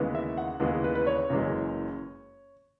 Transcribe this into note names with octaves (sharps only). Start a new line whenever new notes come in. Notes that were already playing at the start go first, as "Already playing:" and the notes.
Already playing: D#2 C#3 E3 G#3 B3
E5
F#5
D#2 C#3 E3 G#3 B3
B4
B4
C#5
F#1 F#2 E3 G#3